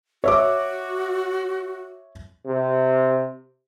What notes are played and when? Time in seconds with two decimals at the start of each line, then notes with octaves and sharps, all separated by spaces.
0.24 F#4 C#5 E5 D6
2.46 C3